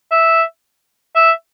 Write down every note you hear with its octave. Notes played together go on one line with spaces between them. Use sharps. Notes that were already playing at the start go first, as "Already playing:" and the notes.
E5
E5